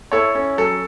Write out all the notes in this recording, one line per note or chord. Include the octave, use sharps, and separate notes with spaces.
E4 A4 C#5
C#4
F#3 A4